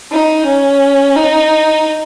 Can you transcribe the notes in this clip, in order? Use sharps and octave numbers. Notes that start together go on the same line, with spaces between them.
D#4
C#4
D#4